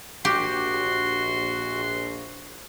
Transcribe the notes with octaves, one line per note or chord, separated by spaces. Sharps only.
A#1 F#4 G4 C6